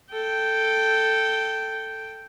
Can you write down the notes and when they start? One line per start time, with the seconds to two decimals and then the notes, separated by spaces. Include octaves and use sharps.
0.13 A4 G5